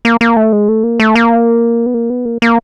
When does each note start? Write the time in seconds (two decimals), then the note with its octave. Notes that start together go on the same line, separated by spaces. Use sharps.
0.05 A#3
0.21 A#3
0.36 A3
0.53 G#3
0.68 A3
0.84 A#3
1.00 A3
1.15 A#3
1.86 B3
1.94 A#3
2.10 B3
2.25 A#3
2.42 A#3